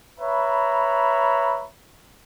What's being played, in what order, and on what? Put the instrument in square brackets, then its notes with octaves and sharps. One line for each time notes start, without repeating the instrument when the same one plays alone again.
[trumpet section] B4 C#5 E5 A#5 B5